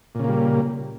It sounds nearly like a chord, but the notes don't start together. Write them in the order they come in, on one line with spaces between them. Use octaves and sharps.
A#2 C#3 A#3 G3